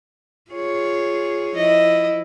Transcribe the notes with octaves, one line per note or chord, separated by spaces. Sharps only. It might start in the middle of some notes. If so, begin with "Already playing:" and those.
F4 G#4 C#5
F3 E4 D#5